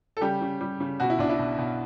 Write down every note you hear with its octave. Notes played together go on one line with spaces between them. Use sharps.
A4
C#3 G3 G4
C#3
G3
C#3
B2 F#4
E4
B1 D4
E4
B2
B2